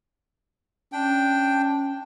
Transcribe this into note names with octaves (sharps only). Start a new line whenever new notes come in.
C#4 D4 G5